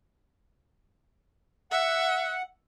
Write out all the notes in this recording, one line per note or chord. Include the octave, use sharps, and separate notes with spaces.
E5 F#5